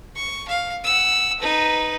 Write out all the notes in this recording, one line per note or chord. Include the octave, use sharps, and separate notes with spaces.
C#6
F5
F#5 E6
D#4 B4